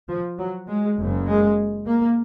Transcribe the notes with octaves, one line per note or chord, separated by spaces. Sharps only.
F3
F#3
G#3
F#1 F#2 C#3
G#3
A#3